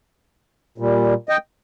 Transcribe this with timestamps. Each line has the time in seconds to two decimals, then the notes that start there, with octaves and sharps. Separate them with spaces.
0.78 A#2 G3
1.29 D#5 G5